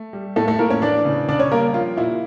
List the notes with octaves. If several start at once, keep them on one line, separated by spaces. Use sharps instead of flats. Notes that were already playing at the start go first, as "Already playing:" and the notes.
Already playing: A3
G3
A2 A3 A4
A3 A4
A2 A#3 A#4
C#4 C#5
E3 D4 D5
C#3
C#3 D4 D5
C#4 C#5
G3 A#3 A#4
F3 F4
A#2 E4